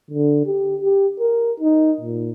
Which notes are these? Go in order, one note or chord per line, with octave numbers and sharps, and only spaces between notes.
D3
G4
G4
A#4
D#4
A#2